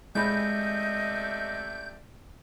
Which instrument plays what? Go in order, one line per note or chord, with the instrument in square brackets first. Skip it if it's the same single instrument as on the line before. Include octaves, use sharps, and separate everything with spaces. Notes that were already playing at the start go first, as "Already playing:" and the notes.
[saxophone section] C3 A3 D5 [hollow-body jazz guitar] G#3 E4 B5 [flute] D#5 [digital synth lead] G6